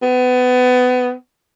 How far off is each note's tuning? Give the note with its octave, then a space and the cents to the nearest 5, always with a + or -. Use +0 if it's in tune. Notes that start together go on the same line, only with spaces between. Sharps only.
B3 +25